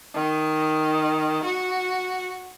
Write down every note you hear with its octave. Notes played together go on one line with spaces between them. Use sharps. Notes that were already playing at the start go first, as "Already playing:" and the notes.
D#3
F#4